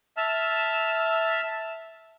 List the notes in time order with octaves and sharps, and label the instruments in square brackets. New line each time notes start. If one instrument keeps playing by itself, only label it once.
[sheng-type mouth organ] E5 A5 E6 F6